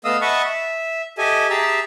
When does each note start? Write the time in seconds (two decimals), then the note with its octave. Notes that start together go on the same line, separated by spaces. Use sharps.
0.05 A3 B3 D#5 F5 D#6 E6
0.21 D#5 E5 F#5 A5 B5 C#6
0.42 E5
1.18 G4 A4 D#5 E5 G#5
1.50 G4 G#4 E5 A5 A#5 E6